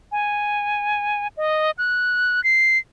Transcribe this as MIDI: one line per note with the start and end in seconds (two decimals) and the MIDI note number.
0.12 1.28 80
1.37 1.71 75
1.78 2.43 90
2.44 2.78 96